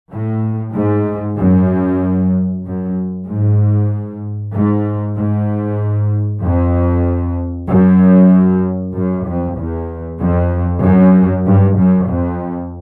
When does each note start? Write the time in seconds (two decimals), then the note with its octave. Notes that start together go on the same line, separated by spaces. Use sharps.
0.13 A2
0.76 G#2
1.39 F#2
2.65 F#2
3.28 G#2
4.54 G#2
5.16 G#2
6.42 F2
7.69 F#2
8.94 F#2
9.25 F2
9.57 E2
10.20 F2
10.83 F#2
11.46 G2
11.78 F#2
12.08 F2